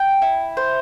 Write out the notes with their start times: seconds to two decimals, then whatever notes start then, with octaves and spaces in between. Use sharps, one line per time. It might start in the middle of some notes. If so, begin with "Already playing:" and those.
Already playing: G5
0.22 E4
0.57 C5